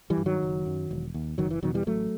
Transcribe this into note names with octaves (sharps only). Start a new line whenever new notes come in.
E3 G3
G2
D#3 F#3
F#1
F#2
E1
D#2
F#1 D#3 F#3
E3
E2 B2 D#3 F#3
E3 G3
A1 F#3 A3